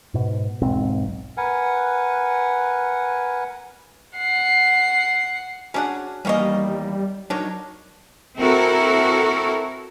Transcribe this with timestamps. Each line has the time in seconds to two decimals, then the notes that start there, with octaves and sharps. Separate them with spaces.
0.14 G#2 B2
0.62 E1 B1 G#2 C4
1.37 A#4 B4 F#5 G#5
4.17 F#5 C7
5.74 F#3 C#4 D4 G#4 F#5
6.25 E2 D#3 G3 A#3 C#4 C#5 D#5
7.30 D#3 F#3 D4 D#4 C#5
8.36 C4 E4 F#4 A4 A#4